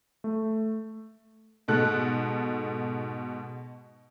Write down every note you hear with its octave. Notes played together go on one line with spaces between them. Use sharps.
A3
G#2 B2 A4 F#6